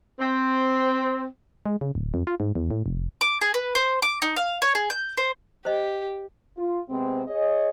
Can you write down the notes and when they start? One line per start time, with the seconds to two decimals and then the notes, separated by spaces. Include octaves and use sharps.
0.19 C4
1.66 G#3
1.81 C#3
1.95 D1
2.14 F2
2.27 F4
2.40 G#2
2.55 E2
2.71 A2
2.86 F1
3.21 D6
3.41 G#4
3.54 B4
3.75 C5
4.02 D6
4.22 D#4
4.36 F5
4.62 C#5
4.75 G#4
4.90 G6
5.17 C5
5.65 G4 C5 D#5
6.57 F4
6.89 C3 G#3 B3 C4
7.27 G#4 C#5 D#5